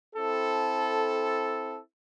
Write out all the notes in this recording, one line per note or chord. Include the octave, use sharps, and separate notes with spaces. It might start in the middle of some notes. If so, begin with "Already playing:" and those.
C4 E4 A4